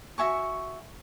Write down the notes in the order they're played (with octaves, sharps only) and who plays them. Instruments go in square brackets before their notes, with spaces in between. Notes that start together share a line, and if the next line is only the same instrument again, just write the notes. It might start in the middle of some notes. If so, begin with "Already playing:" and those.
[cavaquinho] F#4 E5 G#5 C#6